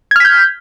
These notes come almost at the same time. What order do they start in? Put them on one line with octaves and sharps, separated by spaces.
G#6 F6 B6 G6